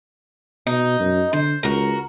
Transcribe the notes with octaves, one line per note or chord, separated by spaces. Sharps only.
B2 D#4
F#2
D3 C5
C#2 F#4 A#4